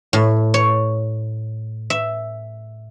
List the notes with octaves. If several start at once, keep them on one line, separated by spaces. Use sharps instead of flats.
A2
C#5
E5